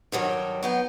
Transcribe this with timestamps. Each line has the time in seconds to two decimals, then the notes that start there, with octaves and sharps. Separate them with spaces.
0.12 G2 D#3 F#3 G3
0.63 F#3 B3 G5